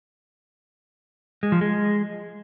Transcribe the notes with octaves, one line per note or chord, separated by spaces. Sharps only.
G#3
F3
G#3